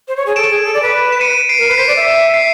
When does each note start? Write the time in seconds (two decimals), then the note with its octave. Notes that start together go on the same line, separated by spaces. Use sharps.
0.08 C5
0.17 C#5
0.26 G#4
0.36 A4 D7 E7
0.50 G#4
0.64 A4
0.74 D5
0.83 B4
1.12 E7
1.21 C#7 D#7
1.49 C7 D7
1.59 A#4
1.68 B4
1.71 C7
1.77 C5 B6
1.88 D5
1.96 E5
2.34 C7